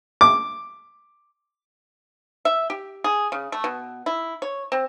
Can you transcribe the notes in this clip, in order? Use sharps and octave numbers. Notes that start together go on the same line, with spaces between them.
D6
E5
G4
G#4
C#3
A3
B2
E4
C#5
C4